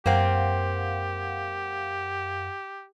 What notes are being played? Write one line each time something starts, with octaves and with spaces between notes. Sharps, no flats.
F#2 A#3 C4 G4 F5 F#5